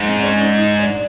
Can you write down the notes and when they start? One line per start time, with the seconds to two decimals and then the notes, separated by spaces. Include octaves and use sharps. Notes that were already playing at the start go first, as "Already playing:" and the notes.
Already playing: G#2
0.08 C4
0.19 D4
0.24 C#4
0.41 D#4
0.58 D#4
0.79 D4